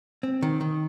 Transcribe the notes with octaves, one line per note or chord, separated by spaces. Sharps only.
C4
D#3
D#3